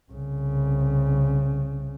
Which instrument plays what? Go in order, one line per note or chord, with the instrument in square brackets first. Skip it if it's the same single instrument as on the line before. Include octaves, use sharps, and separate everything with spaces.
[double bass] C2 C#3